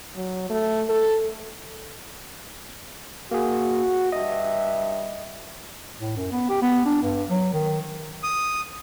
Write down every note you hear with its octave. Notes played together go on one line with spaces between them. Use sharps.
F#3
A3
A4
A#3 F#4 G#4
G2 D#5 E5
A2
F#2
B3
G4
B3
D4
G2
F#3
D#3
D#6